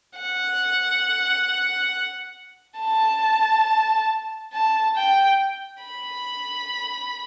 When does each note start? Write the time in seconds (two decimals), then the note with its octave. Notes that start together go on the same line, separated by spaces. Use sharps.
0.19 F#5
2.79 A5
4.53 A5
4.97 G5
5.83 B5